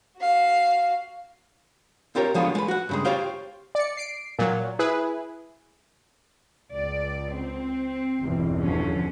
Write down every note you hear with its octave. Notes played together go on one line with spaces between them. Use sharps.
F#4 F5
C4 F4 G4 A#4 C#5
D3 F3 G#3 B3 F4 C#5
G#3 B4
F#4 F#5
G2 C#3 G#3
F4 G4 C5 C#5 F5 G5
D5 C#7
C7 D7
A#2 F#3
E4 G#4 B4
C#2 D5
C4
G1 E2 B2
D3 F3 C#4